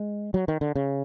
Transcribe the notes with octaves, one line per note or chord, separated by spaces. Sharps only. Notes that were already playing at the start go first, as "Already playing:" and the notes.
Already playing: G#3
F#3
D#3
D3
C#3